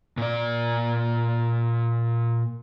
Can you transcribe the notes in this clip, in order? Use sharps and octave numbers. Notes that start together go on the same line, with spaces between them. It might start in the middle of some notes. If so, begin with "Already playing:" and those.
A#2 D5